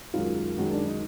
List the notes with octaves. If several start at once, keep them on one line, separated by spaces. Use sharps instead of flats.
F#2 D#3 G#3 F4
F#2 D#3 G#3 F#4
D4
D#4